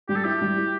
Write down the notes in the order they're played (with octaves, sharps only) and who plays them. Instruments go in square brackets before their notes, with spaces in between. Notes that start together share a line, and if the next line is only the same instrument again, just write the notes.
[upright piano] G3 [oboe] G4
[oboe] A4
[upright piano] E4 [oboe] G4
[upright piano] G3
E4